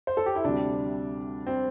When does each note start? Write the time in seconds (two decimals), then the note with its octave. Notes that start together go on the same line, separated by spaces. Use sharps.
0.07 C5
0.17 A4
0.26 G4
0.36 E4
0.44 D2 C3 G3 D4
1.47 C4